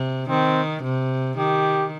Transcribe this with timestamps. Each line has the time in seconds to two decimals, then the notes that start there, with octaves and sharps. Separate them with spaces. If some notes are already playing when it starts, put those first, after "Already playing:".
Already playing: C3
0.29 D#3 C4
0.83 C3
1.37 D#3 G4